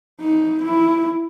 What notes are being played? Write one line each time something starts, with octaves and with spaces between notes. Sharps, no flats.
D#4
E4